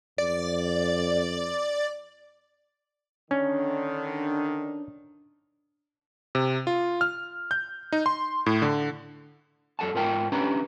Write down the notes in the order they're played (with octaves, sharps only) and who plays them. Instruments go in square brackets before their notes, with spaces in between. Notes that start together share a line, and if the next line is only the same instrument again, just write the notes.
[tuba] F2 [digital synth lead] D5
[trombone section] D3 D#3 [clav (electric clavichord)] C#4 [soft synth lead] D4
[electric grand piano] C3
F4
F6
G6
D#4
C6
A2
D3
[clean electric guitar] F#2 A4 F#5 A5
G#2 F4 A#4 F#5 G5 A5
C#4 D4 E4 G4 B4 A#5